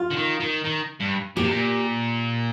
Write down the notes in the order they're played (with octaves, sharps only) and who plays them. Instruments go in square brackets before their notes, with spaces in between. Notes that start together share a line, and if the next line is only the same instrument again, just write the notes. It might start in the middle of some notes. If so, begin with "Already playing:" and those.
Already playing: [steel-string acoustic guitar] F4
[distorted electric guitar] D3
D#3
D#3
D#3
G2
[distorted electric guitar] A#2 [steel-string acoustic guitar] G4
[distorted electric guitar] C3
A#2